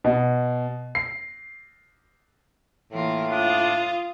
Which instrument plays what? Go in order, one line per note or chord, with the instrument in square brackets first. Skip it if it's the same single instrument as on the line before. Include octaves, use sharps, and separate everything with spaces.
[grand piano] B2
C7
[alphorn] A2 [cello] E3 [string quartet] A#3 F4 A#4
[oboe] D4 [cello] F4 [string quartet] D#6